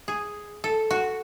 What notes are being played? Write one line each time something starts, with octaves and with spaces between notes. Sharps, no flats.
G#4
A4
F#4